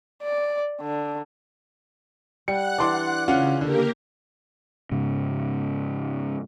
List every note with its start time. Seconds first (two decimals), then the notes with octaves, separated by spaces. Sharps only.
0.23 D5
0.81 D3
2.48 G3 F#5 F#6 C#7
2.78 E3 D4 D5 C6 D6
3.28 C#3 C#4 F4 F#5
3.61 D3 A#3 G4 A#4
4.91 G#2 C#3